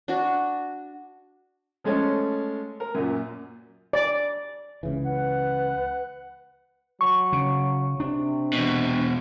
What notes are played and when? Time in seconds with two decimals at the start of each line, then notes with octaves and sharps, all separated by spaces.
0.08 D4 F#4
1.84 F3 G#3 A3 C#4
2.80 A#4
2.95 F#2 A#2
3.93 D5
4.83 C#2 C#3 E3
5.05 B4 F#5
7.01 F#3 C#6
7.33 C#3
8.00 C3 D4
8.53 E2 B2